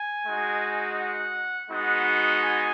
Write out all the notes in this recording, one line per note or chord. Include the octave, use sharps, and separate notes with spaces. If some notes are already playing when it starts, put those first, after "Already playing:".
Already playing: G#5
G#3 D#4 F#4
F#5
G#3 B3 D#4 F#4 F#5
G#5